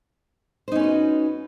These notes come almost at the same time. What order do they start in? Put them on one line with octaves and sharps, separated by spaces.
C5 D#4 C#4 B4 F#4